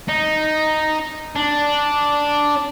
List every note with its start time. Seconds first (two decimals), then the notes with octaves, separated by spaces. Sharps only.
0.09 D#4
1.35 D4